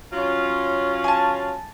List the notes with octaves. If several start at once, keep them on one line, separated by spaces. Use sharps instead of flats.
F#3 C#4 F4
G#5 A5